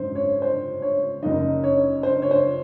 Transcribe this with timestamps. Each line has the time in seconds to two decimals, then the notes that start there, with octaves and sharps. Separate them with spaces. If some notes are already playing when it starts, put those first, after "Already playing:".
Already playing: G#1 F#2 D#3 C5
0.15 C#5
0.42 C5
0.82 C#5
1.23 F#1 F#2 D#3 D#4 D#5
1.64 C#5
2.03 C5
2.22 C#5
2.31 C5